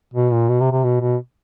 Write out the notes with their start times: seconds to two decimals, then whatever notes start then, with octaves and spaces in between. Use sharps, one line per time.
0.14 B2
0.32 A#2
0.49 B2
0.61 C3
0.72 C3
0.84 B2
1.00 B2